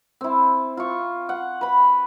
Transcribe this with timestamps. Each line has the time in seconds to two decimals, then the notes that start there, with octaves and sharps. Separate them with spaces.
0.21 C4 E4
0.77 F4 C#6
1.29 F#5
1.61 B4 B5